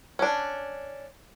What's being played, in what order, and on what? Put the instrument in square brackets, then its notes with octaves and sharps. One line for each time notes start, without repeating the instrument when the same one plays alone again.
[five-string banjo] C#4 D4